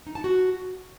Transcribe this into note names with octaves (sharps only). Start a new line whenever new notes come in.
D#4
A5
F#4